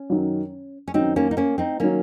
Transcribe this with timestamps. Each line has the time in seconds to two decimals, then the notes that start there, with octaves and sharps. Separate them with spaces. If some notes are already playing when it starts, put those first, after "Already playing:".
Already playing: C#4
0.10 F#2 D#3 F#3
0.88 C#4
0.94 F#2 D#3 F#3 C4 D#4
1.16 A#3 C#4
1.31 D#4
1.37 A#3 C#4
1.58 C4 D#4
1.80 D#3 F#3 A#3 C#4